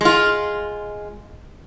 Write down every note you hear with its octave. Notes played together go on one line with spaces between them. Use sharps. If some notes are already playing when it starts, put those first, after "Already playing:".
G#3 F4